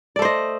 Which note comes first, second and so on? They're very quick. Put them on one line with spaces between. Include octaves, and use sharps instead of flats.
D5 A3 C5 D#5